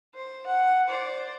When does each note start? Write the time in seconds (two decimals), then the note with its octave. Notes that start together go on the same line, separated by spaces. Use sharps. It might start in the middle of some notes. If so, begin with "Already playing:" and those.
0.14 C5
0.46 F#5
0.88 C5 D5